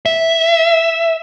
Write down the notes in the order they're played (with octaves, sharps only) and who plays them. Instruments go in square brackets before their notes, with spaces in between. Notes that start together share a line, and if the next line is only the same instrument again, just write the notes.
[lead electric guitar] E5